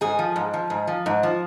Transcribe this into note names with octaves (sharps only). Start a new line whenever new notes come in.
G#2 G#4
F3
G#2
F3
G#2
F3
G#2
F3